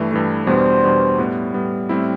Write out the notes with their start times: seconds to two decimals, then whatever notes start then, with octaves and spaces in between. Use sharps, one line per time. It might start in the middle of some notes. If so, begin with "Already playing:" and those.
Already playing: G2 E3 A3
0.11 G2 E3 A3
0.47 E2 B2 G3 B3 D4 C5
0.83 E2 B2 G3 B3 D4
1.18 A2 G3 B3
1.54 A2 G3 B3
1.89 A2 G3 C4 E4